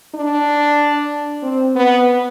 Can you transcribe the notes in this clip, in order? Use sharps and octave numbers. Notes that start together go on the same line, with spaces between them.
D4
C4
B3